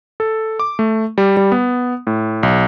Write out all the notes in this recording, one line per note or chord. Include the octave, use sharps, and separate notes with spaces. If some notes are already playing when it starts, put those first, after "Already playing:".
A4
D6
A3
G3
G3
B3
A2
B1